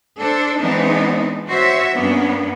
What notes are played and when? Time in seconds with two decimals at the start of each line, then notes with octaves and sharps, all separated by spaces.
0.19 D4 A4 C5
0.59 E3 G#3 B3 C4 D4 D#4
1.49 F#4 C5 C#5 E5
1.94 G2 A#3 B3 C#4 D4